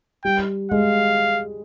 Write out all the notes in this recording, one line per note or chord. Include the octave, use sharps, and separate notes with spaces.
G3 G5
G#3 F5